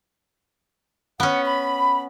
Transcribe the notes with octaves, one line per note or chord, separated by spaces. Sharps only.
B3 C#4 F#5
B5